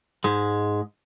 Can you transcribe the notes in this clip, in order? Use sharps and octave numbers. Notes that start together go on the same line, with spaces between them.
G#2 G#3